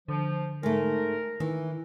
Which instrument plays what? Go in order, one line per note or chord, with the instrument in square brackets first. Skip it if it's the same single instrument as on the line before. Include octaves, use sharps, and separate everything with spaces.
[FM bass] D3 [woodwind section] F3
[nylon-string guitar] G#2 A3 [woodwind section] A#4
[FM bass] D#3 [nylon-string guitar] E3